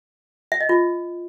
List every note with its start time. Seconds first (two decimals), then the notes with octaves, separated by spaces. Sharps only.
0.52 E5
0.61 D#5
0.69 F4